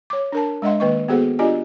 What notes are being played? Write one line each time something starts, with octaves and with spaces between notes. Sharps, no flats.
C#5 D6
D4 A#4 A5
G#3 D4 D#5 E5 F#5 C6
D#3 A#3 B4 D#5 C#6
B3 F#4 G#4 A4 C5 F#5
D4 F4 G4 D5 D#5 G#5